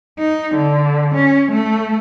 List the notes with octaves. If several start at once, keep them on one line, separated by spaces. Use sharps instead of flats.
D#4
D3
C#4
A3